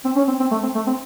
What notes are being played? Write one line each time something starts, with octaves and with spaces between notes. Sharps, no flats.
C4
C#4
C4
C4
A3
C4
A3
C4